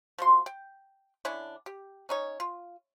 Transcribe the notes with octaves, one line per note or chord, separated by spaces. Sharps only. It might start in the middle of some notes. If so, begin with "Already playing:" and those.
F3 F#4 C6
G5
D3 C#4 D4 E4
G4
C#4 D#4 C#5
F4